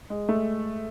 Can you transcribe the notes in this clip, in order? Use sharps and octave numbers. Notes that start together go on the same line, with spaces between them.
G#3
A3